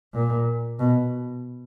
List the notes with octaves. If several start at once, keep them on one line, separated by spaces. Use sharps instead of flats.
A#2
B2